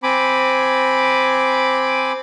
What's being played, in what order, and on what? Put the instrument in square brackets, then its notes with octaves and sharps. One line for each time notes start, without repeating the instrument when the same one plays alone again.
[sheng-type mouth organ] C4 G#5 B5 D6